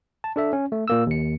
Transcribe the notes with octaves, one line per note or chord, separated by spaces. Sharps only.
A5
D4 A4 E5
C#4
A3
A#2 A#3 E6
D#2 C#7